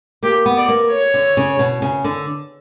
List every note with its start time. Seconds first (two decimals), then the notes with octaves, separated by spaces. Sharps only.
0.23 A#3 G4
0.46 B3
0.57 D5
0.68 A#3
0.91 C#5
1.14 D3
1.37 C#3
1.59 B2
1.82 C#3
2.04 D3